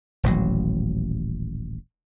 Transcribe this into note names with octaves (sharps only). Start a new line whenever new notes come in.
D#1 A1 F#3